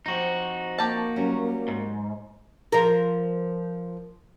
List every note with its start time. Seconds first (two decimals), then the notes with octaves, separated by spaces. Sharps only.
0.06 F3 C4 D#4 F#4
0.78 A#3 G4 A5
1.16 F#3 G3 C#4
1.68 G#2
2.72 F3 A#4